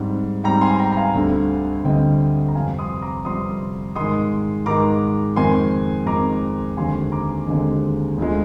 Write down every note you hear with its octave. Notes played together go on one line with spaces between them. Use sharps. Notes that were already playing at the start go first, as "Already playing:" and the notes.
Already playing: G#2 G3 C4
G#2 G3 C4 G5 A#5
G#5 C6
G5 A#5
A#5
F5 G#5
D2 D3 G3 C4
D2 D3 G3 C4 D#5 G5
A#5
F2 C3 G3 C4 F5 G#5
C6 D#6
A#5 D6
F2 C3 G3 C4 C6 D#6
G#2 D#3 G#3 C6 D#6
G#2 D#3 G#3 A#5 D6
F2 D#3 G#3 C4 G#5 C6
F2 D#3 G#3 C4 A#5 D6
D#2 D3 G#3 C4 G#5 C6
A#5 D6
D#2 D3 G#3 C4
D2 D3 F3 G#3